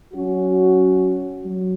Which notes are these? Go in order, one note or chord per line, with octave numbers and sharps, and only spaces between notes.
F#3 C#4 F#4
F#3